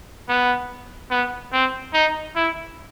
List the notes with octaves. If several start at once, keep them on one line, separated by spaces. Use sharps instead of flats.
B3
B3
C4
D#4
E4